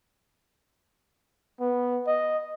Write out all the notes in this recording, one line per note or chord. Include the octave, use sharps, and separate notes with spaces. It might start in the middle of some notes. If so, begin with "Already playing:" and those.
B3
D#5